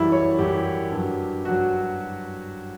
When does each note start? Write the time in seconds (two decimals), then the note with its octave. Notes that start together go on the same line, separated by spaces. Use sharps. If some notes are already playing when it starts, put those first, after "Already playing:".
Already playing: F#2 E3 G3 E4
0.12 C#5
0.39 F#2 E3 G3 G4
0.92 G2 F#3
1.45 G2 F#3 F#4